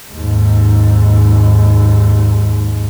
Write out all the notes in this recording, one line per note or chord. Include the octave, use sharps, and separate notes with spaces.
D#2 G#2